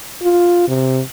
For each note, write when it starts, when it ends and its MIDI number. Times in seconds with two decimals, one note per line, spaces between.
0.22 0.65 65
0.68 1.02 48